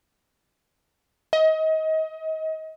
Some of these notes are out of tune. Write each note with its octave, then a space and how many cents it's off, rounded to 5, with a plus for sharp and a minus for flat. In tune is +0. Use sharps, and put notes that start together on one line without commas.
D#5 +30